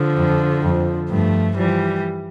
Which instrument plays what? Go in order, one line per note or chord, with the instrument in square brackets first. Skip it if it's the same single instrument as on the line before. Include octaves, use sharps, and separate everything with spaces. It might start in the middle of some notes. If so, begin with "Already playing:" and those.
Already playing: [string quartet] D3 F3
[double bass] F2
F2
[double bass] G2 [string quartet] F3 A3
[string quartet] E3 G3 [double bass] F3